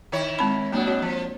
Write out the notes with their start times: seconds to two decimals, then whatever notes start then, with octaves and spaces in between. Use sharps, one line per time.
0.12 D#3 E4 C#5
0.39 G#3 C4 B5
0.72 B2 F#3 A#3 D4 F#4
0.87 C4 F#4 C#5
1.02 F3